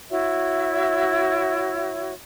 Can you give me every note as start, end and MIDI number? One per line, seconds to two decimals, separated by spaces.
0.10 2.13 64
0.10 2.13 66
0.10 2.13 73
0.10 2.13 76